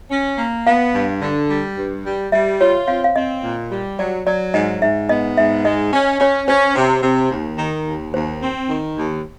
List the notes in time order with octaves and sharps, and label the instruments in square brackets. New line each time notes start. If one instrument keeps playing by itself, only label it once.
[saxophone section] C#4
A#3
[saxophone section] B3 [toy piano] F5
[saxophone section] G2
D3
G3
G2
G3
[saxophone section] G3 [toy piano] E5
[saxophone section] F4 [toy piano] C#5
[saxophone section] C4 [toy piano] F5
[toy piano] F5
[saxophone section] C4 [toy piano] D#5
[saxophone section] A#2
G3
[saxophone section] F#3 [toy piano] D5
[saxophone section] F#3 [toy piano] D5
[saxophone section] G#2 [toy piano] D#5
[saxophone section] G#2 [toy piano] E5
[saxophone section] B3 [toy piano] D#5
[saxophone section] G#2 [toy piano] E5
[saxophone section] G#3 [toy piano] D#5
[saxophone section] C#4
[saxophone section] C#4 [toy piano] C#5
[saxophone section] C#4 [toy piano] C5
[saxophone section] C3
C3
D#2
D#3
D#2
[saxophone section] D#2 [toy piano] C5
[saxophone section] C4
D#3
D#2